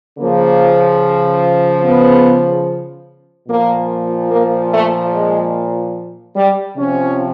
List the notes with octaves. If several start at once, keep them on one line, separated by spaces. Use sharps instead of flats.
C#3 F3 A#3
B3
A#2 F3 A#3
A#3
A3
G#3
G3
C3 F3 C#4